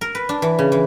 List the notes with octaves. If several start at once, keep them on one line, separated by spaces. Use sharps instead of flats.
A#4
B4
D4
E3
C#3
E3